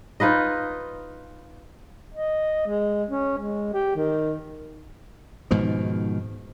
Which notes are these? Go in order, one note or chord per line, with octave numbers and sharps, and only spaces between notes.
D#4 F4 B4 D#5
D#5
G#3
C#4
G#3
G4
D#3
G#2 B2 D#3 F3